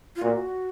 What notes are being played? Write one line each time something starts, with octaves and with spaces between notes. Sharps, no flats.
F4
A#2 F#4